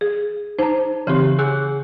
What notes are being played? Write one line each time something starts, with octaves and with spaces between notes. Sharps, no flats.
G#4
D#4 C5 A5 A#5
C#3 E3 C4 G4 C#5
G#4 G#5 E6 F#6